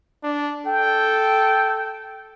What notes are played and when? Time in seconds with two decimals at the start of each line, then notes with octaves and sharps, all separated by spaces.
0.23 D4
0.67 A4 G5